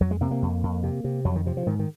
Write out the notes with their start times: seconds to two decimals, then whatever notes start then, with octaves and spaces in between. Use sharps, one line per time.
0.01 F2 F#3
0.11 G#3
0.21 C3 A#3
0.31 A#3
0.42 F2
0.63 F2
0.83 C3
1.04 C3
1.25 F2 F#3
1.36 D#3
1.46 C3 F3
1.57 F3
1.66 G#2 D#3
1.79 D#3